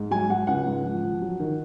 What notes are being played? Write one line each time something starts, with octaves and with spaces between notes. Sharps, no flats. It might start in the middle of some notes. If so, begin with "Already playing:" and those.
Already playing: G#2
F#3 G#5
F#3 F#5
C#2 F#5
G#2
F3
F3
F#3
D#3